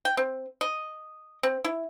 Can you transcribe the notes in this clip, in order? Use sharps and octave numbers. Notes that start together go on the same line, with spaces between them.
G5
C4
D#5
C4
E4